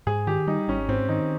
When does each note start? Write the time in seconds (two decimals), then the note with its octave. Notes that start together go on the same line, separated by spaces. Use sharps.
0.07 G#2 G#4
0.27 D#3 G4
0.47 G3 D#4
0.68 G#1 C#4
0.88 G#2 C4
1.09 D#3 D#4